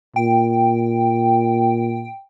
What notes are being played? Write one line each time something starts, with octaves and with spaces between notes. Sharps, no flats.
A#2 G5